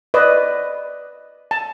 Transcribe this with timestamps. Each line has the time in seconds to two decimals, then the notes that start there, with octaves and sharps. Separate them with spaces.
0.14 B4 D5 D#5
1.51 A5